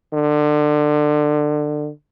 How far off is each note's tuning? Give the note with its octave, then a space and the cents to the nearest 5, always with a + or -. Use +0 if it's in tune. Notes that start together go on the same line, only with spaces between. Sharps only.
D3 +25